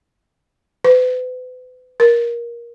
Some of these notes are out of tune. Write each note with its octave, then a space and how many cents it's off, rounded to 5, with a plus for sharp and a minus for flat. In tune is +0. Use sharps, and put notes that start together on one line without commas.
B4 +40
A#4 +20